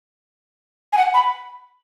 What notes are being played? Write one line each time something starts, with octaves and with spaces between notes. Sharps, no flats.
G#5
F#5
B5